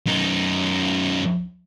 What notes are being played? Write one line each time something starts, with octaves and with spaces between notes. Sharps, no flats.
F#2 D#4